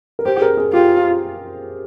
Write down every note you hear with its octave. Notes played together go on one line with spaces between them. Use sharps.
A#4
G4 C5
G#4
A#4
G#4
F4 G4